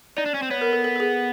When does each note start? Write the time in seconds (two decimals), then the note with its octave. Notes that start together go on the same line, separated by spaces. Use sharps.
0.17 D#4 D5
0.26 D4
0.34 C#4
0.42 C4
0.51 B3 C#5
0.61 A#4
0.73 A4
0.84 A4
0.96 A4
1.00 G#4